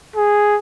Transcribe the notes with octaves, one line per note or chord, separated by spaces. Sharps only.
G#4